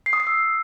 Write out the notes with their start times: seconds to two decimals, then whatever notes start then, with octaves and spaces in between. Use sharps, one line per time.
0.06 C7
0.13 D#6
0.20 C7
0.27 E6